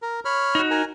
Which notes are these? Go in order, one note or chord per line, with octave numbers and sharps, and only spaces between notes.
A#4
C#5 B5 F6
D#4 F#4
A#4 G#5